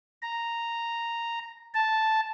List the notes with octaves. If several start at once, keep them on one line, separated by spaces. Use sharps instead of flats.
A#5
A5